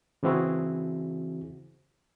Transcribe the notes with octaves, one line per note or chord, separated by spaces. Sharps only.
C#3 E3 C4 E4 F#4 G#4